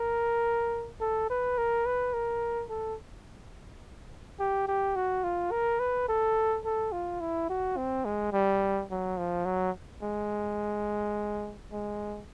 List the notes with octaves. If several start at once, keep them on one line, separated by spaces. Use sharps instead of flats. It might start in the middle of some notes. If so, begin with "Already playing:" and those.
Already playing: A#4
A4
B4
A#4
B4
A#4
A4
G4
G4
F#4
F4
A#4
B4
A4
A4
F4
E4
F#4
C4
G#3
G3
F#3
F3
F#3
G#3
G#3